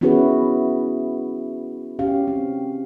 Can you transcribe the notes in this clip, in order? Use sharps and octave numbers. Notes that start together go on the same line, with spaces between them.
B3 C#4 E4 F#4 G#4 B4
C#4 G4 F5
C4